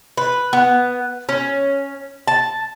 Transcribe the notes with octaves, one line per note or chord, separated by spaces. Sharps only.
B4
B3
C#4
A5